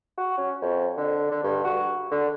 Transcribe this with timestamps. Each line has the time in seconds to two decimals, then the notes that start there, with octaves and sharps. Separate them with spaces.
0.17 F#4
0.37 C#4
0.62 F2
0.97 D3
1.31 D3
1.44 G2
1.64 F#4
2.11 D3